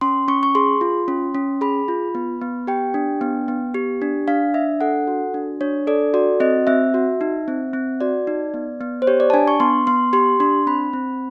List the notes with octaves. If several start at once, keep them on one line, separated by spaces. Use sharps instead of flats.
C#4 C6
C#4 C#6
C#6
G#4 C6
F4
C#4
C#4
G#4 B5
F4
B3
B3
G4 G5
D4
B3
B3
G4
D4
D4 F5
D4 E5
A4 F#5
F#4
D4
D4 C#5
A4 D5
F#4 D5
C4 D#5
C4 E5
F#4
D#4
C4
C4
F#4 D5
D#4
B3
B3
C5
G4 C#5
D5
A5
D4 G#5
C#6
B3 C6
B3 C6
G4 C6
D4 C6
C4 B5
C4